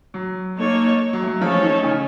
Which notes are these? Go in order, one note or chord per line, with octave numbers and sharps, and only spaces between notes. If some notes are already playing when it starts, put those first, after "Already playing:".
F#3
A#3 D#4 A4 C#5
F#3
A3
F#3
F3 A3 C#4 F4 A4 C#5
D#3 D#4
C#3 C#4